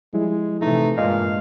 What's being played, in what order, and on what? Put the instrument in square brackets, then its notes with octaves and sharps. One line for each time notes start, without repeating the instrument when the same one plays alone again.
[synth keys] F3 G3 E4 [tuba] G#3
[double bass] C3 E3 [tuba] A3 [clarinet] D#4
[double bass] G2 G#3 [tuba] A#2 [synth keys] D#5 [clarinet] F5